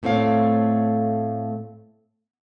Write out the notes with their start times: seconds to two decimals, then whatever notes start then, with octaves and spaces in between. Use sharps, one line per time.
0.03 A2 A3 C4 C#5 F5